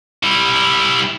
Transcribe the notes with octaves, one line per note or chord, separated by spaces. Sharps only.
G3 E4